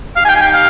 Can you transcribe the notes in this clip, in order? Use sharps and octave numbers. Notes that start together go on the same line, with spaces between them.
D#4 G4 F5
G#5
G5
G#5
G5
F5